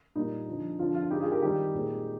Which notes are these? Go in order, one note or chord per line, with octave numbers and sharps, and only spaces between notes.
A#2 G3 A#3 D#4
D3 F3 C4
D3 F3 C4 F4
F4
D3 G#3 C4 D#4 G4
F4 G#4
G4 A#4
D#3 G3 C4 D#4 G4
A#2 G#3 C4